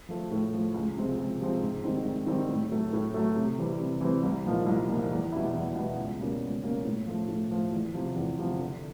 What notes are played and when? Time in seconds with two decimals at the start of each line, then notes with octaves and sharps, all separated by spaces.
0.09 F3 A3
0.31 A2
0.53 F3 A3
0.74 C#2
0.97 C3 F3 G#3 C4
1.18 C#2
1.41 C3 F3 G#3 C4
1.62 G#2
1.84 D#3 G3 C4
2.05 G#2
2.27 D#3 G3 C4
2.49 A2
2.71 F#3 A3
2.93 A2
3.14 F#3 A3
3.36 C3
3.58 E3 G3 C4
3.80 C3
4.01 E3 G3 C4
4.23 C2
4.45 A#2 F3 A#3 D#4
4.66 C2
4.89 A#2 F3 A#3 D#4
5.11 E2
5.32 B2 G3 B3 E4
5.54 E2
5.75 B2 G3 B3 E4
5.98 C#2
6.19 B2 G3 A#3 C#4
6.41 C#2
6.64 B2 G3 A#3 C#4
6.85 A2
7.07 F3 A3
7.28 A2
7.51 F3 A3
7.73 E2
7.94 C3 F3
8.16 E2
8.38 C3 F3
8.59 D3